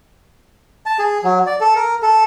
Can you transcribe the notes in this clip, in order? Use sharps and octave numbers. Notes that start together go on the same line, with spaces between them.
A5
G#4
F#3
D5
A4
A#4
A4